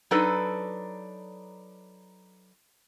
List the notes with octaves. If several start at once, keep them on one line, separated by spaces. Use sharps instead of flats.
F#3 D4 D#4 A4 B4